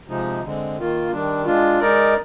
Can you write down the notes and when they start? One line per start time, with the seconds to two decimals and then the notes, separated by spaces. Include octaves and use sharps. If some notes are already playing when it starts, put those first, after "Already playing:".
0.08 C3 F3 G#3 D#4
0.43 D3 G#3 C4
0.77 D#3 A#3 F4
1.12 D#3 G3 D4
1.45 G#3 D4 F4
1.80 G#3 D#4 A#4 D5